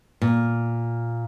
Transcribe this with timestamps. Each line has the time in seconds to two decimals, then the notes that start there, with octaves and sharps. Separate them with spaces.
0.22 A#2